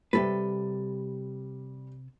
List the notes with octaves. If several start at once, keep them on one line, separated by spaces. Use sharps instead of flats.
C3 G3 A4 B4